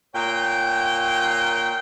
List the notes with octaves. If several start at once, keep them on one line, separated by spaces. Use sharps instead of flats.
A#2 C#5 G5